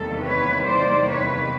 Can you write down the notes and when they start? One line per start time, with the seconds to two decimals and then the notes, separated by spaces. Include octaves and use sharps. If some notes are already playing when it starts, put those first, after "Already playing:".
Already playing: E2 C3 D#3 G3 A#3 A4
0.22 B4 C#5
0.65 C5 D5
1.09 B4 C#5